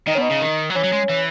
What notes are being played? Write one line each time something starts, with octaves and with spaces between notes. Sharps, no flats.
D#3 D#4
C#4
B2 D#4
C#3
D#3
F#3
E3 C#4
F#3
G#3
E3